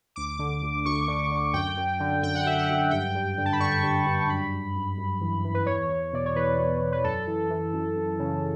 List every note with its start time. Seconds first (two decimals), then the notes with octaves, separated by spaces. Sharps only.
0.16 D2 D6
0.39 D3
0.62 D2
0.85 D2 C#6
1.08 D3
1.31 D3
1.53 F#2 G5
1.77 F#2
2.00 D3
2.22 F#2 G5
2.35 F#5
2.45 F#2 E5
2.59 F#5
2.69 F#2
2.91 G2 G5
3.15 G2
3.38 D3
3.46 A5
3.53 B5
3.60 D3 C#6
3.83 G2
4.06 G2
4.29 F#2 B5
4.52 F#2
4.75 F#2
4.97 F#2
5.21 E3
5.44 E3
5.54 B4
5.66 E2 C#5
5.89 E2
6.13 B2 D5
6.26 C#5
6.35 E2 B4
6.58 B2
6.81 E2
6.92 B4
7.04 F#2 A4
7.27 E3
7.50 E3
7.73 F#2
7.96 F#2
8.19 C#3